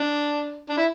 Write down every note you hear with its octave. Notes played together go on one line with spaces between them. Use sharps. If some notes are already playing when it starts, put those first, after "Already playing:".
Already playing: D4
D4
E4